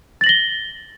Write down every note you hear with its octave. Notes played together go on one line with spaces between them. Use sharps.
A6 A#6 F#7 G7